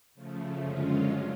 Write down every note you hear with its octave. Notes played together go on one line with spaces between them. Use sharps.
C#3 F3 A3
F#2 D3 G#3 C#4 F4